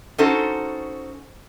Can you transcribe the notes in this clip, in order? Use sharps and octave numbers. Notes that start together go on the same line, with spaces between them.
C#4 D#4 F#4 A4 C5